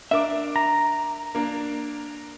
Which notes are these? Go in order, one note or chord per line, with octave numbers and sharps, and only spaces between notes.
D4 A#4 E5 D6
A#5
A#3 D4